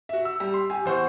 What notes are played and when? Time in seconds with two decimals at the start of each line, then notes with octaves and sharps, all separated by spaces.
0.09 F#4 E5
0.25 E6
0.40 G3
0.54 C6
0.70 G4 G#5
0.85 E2 C5 F#5 C#6